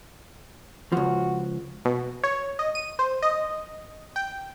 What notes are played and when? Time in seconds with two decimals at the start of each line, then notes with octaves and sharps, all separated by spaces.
0.92 C#2 F3 F#4
1.85 B2
2.23 C#5
2.59 D#5
2.75 D#7
2.99 C5
3.22 D#5
4.16 G5